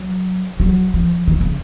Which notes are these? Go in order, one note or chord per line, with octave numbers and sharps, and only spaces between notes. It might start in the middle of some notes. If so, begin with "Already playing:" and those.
Already playing: F#3
F#3
F3
D#3
C#3